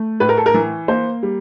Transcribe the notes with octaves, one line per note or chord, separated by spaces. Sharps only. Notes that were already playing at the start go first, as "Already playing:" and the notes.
Already playing: A3
A2 B4
A#4
A4
A#4
E3
A#3 C5
G3